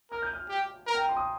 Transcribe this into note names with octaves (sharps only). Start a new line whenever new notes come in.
A#4 F6
G6
F6
G4
A#4
G5
A#5
C6
D#6